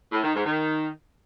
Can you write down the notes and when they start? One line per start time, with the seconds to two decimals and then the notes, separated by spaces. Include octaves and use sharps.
0.12 A2
0.23 D#3
0.35 G#2
0.46 D#3